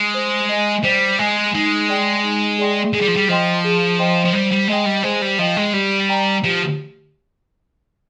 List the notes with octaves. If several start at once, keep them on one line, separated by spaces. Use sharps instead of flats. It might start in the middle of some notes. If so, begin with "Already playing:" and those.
Already playing: G#3
C5
D#5 G#5
G3 C5
G#3 D#5 G#5
G#3 D#4
G#4 D5 G5 C6
D#4
G#4 D5 G5 C6
G#3 G#4
G3
F3
G3
F3 C5 D#5 G5 C6
G#4
C5 D#5 G5 C6
F3
G3 C5
G3
G#3 D#5 G5
G3
G#3 C5
G3
F3 D#5 G5
G#3
G3 G4
D5 G5 A#5
F3 G4